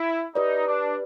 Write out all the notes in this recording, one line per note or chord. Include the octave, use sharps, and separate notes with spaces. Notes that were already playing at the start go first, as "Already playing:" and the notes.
Already playing: E4
D#4 G4 B4 D5
D4